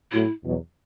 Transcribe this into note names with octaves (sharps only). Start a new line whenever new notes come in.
A2 F#3 A3 E4
E2 B2 F#3